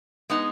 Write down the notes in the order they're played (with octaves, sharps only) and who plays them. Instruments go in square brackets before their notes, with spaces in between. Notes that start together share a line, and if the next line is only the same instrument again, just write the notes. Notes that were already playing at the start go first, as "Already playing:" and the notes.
[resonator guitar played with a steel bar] G#3 B3 D#4